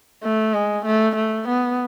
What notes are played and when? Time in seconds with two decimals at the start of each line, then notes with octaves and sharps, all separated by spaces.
0.23 A3
0.54 G#3
0.85 A3
1.16 A3
1.48 B3